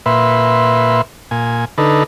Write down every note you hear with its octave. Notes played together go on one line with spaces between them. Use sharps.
A#2 B4 E5 C6
A#2 G#5
D3 D#4 A4 B4